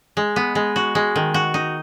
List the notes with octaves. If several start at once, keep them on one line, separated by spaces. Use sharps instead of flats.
G#3
B3
G#3
F#4
G#3
D#3
F#4
D#4